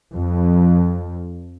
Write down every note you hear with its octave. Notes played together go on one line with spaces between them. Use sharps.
F2